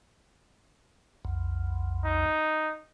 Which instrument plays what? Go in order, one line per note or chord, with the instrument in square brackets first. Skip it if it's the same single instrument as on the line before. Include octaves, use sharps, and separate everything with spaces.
[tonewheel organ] B1 F2
[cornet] D#4